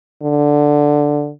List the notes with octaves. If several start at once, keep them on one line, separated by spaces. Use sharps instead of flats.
D3